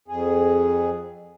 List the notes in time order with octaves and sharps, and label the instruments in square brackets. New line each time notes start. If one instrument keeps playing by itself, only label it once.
[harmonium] F2 G#4